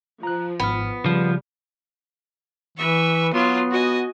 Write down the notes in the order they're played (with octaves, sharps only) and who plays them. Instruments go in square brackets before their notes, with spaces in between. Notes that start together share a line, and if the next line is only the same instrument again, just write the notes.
[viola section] F3 [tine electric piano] A#5 F#6
[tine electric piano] G#1 G#2 F6 [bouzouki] B3
[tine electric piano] C#3 [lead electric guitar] F3 [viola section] G3
[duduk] E3 [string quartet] B4 E5 C#6
[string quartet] F#3 F4 C6 [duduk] B3
[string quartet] F#4 D#5 G#5